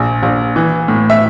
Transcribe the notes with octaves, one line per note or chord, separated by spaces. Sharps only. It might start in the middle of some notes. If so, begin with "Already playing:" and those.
Already playing: A#1
A#1
E3
A2
E5